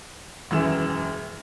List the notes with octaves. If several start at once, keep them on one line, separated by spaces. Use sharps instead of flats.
E1 F#2 E3 E7